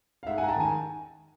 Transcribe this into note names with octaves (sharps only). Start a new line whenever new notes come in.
F5
G#2 E5 F#5
F#5 G#5
G#2 A#5
G5 A5
D#3 G#5 A#5